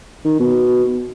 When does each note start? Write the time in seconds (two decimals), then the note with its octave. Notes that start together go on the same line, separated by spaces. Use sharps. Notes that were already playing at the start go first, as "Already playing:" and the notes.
0.25 D#3
0.39 B2